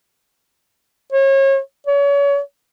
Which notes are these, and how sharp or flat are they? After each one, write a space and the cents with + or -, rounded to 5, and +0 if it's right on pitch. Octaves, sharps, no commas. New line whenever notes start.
C#5 -35
C#5 +35